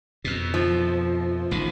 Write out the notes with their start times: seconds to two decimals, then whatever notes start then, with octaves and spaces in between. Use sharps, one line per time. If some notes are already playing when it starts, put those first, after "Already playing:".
0.24 F2 B2
0.54 F3
1.51 A1 D#3